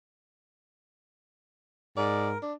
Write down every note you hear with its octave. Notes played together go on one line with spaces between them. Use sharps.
G#2 A#4 D5
D4